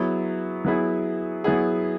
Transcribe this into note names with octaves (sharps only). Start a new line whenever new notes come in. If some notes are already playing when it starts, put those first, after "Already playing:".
Already playing: F#3 B3 E4 G#4
F#3 B3 E4 G#4
F#3 B3 E4 G#4